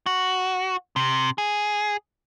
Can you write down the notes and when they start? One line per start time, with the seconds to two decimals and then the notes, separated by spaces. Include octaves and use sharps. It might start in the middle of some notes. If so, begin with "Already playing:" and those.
0.06 F#4
0.96 C3
1.38 G#4